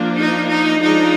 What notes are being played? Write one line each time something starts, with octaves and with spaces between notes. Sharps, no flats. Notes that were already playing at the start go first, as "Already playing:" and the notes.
Already playing: F3 A#3 D4
D#4
D#4
F3 G#3 D4 D#4